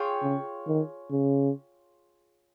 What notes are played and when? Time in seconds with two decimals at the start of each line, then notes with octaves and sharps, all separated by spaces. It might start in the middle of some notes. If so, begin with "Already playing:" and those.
Already playing: F4 G#4 C#5 G5
0.22 C#3
0.67 D#3
1.11 C#3